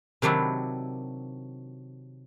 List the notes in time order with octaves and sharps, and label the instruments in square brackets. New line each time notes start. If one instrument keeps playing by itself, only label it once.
[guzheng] C3 D#3 F#3 D4 E4